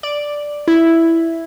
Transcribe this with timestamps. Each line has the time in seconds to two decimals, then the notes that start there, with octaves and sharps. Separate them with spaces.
0.03 D5
0.68 E4